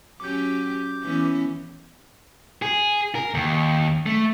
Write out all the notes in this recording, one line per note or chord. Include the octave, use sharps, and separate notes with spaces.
F#3 C#4 G4 D6 G6
E3 B3 C#4
G#4
A#4
D#2
A3